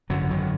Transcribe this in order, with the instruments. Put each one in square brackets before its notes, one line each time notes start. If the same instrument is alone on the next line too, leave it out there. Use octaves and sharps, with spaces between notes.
[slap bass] G#1 F#2 D3 F#3
D#3 F#3